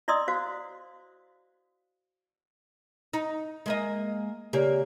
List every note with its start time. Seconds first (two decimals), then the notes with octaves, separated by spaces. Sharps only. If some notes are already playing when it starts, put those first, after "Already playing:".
0.08 E4 D5 D#5 C6 D#6 E6
0.28 F#4 C5 F5
3.13 D#4
3.66 G#3 A#3 D#5
4.53 C#3 A#3 G4 C#5 D5